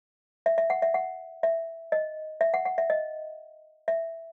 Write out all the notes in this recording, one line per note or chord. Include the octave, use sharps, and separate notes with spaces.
E5
E5
F#5
E5
F#5
E5
D#5
E5
F#5
F#5
E5
D#5
E5